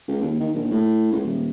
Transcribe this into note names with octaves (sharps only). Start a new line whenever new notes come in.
C#2
D#2
D#3
A#1
A2
C#2
D#1